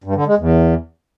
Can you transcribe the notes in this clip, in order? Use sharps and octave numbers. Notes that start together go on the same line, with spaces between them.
G2
D3
G#3
E2